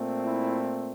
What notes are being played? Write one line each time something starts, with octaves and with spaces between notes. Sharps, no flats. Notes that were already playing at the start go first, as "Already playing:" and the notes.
Already playing: A#2 A3 C4
E4